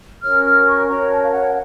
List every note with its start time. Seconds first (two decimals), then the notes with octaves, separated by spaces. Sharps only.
0.22 C#4 F#4 A#4 C#5 F6
0.45 F6
0.66 C#6
0.88 C#4 F#4 A#4 C#5 A#5
1.09 A5
1.23 F5
1.31 F#5